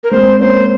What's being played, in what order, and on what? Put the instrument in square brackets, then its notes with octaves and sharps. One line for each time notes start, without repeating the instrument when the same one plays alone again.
[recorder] A#4
[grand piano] G#3 C4 [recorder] C5
[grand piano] A#3 C#4 [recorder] C5